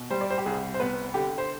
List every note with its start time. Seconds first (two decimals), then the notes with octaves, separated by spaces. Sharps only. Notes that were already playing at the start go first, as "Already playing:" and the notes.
Already playing: B2
0.10 G3 C5
0.21 D5
0.30 C5
0.38 G4
0.46 C2 G#4
0.74 C5
0.80 B3 B4
1.14 D3 G4
1.38 C5